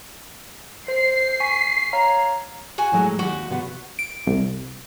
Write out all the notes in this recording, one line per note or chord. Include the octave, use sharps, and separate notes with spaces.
C5 C7
G#5 C#6 B6
C#5 F5 A#5
F#4 G#5
A2 F#3 G#3
D#2 G#2 F#4 G4
C3 B3 F#5
D7
C2